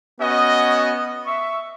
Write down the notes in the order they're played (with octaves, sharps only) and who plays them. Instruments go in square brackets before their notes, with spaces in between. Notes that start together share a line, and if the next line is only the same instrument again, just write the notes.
[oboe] B3 [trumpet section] C#4 F#4 D#5
[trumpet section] E5 [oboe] C#6